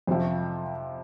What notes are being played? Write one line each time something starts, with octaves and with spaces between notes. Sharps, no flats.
F2 C3 F3 C5